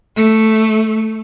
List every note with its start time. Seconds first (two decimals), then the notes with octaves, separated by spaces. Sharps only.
0.17 A3